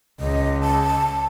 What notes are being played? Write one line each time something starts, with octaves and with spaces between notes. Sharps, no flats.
C#2 D#5
A5